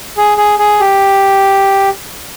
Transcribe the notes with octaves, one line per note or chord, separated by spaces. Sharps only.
G#4
G#4
G#4
G4